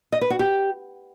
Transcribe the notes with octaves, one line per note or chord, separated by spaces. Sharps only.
D#5
B4
F#4
G4